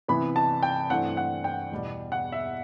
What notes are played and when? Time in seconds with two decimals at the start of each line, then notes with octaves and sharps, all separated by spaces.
0.08 C3 E3 B3 B5
0.36 A5
0.63 G5
0.90 G2 E3 A3 C4 F#5
1.17 F#5
1.44 G5
1.72 E2 B2 G3
2.12 F#5
2.32 E5